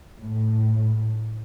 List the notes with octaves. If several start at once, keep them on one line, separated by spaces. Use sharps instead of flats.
A2